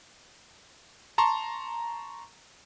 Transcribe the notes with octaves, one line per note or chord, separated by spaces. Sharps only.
A5 A#5 C6 C#6